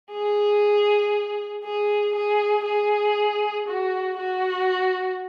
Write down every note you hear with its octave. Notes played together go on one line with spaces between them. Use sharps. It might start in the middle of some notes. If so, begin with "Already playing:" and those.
G#4
G#4
G#4
G#4
F#4
F#4